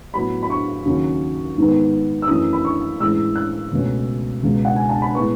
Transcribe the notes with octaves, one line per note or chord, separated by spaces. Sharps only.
A2 F#3 B3 B5
B5
C#6
D#2 C#3 F#3 C#4
G#2 D#3 G#3 B3
E6
F#2 E3 A3 C#4 D#6
B5
C#6
A2 E3 G#3 C#4 E6
F#6
C#2 B2 A3 C#4
C#2 B2 G#3
F#5
G#5
A5
B5
A2 G#3 B3 C#6